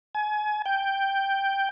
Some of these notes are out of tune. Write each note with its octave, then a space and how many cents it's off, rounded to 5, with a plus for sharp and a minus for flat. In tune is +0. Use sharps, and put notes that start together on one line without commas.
G#5 +30
G5 +0